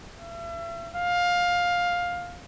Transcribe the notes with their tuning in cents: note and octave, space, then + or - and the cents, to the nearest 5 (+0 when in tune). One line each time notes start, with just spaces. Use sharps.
E5 +40
F5 +15